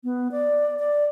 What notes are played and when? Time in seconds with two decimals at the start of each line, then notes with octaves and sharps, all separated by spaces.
0.04 B3
0.31 D5
0.79 D5